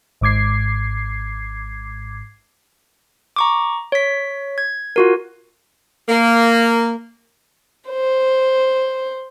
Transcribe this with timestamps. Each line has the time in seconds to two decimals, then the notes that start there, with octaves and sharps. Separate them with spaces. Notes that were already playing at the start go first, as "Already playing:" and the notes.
0.21 G#1 G#2 D6 G#6 C7
3.36 A#5 C#6 D6
3.92 C#5 B6
4.58 G#6
4.96 F4 F#4 A#4
6.09 A#3
7.89 C5